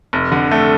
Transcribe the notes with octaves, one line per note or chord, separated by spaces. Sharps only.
F1
D3
A3